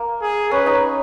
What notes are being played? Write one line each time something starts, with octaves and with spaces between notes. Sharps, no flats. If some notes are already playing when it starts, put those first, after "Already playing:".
Already playing: A#3
G#4
C#4 B4
D#4